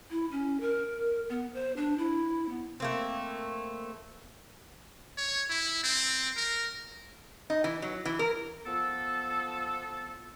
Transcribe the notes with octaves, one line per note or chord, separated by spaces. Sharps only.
E4
C#4
A#4
B3
C5
D4
E4
B3
A3 A#3 C4
C#5
E4
C4
A#4
D#4
E3
F#3
E3
A#4
F3 B3 A4